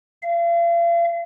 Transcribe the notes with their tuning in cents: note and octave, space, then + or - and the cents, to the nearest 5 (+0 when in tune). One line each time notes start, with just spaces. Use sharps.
F5 -40